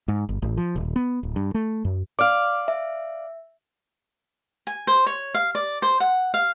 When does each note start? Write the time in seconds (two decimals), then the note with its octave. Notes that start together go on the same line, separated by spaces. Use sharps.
0.08 G#2
0.29 G1
0.42 A1
0.57 F3
0.76 D#1
0.96 B3
1.23 D1
1.36 G2
1.54 A3
1.85 F#2
2.19 D5 F5 D6 F6
2.68 E5
4.67 G#5
4.87 C5
5.06 C#5
5.34 F5
5.55 D5
5.82 C5
6.00 F#5
6.34 F5